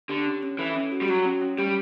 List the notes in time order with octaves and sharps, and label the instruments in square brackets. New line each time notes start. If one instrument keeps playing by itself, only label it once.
[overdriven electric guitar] D3 [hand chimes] G4
[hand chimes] C#4
C#4
[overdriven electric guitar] E3 [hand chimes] A4
[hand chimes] C#4
F#4
[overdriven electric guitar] G3
[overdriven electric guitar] F#3 [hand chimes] F#4
[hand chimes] C#4
C#4
[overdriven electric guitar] G3 [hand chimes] G4